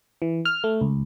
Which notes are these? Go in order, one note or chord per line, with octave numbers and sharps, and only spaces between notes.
E3
F6
A3
C#2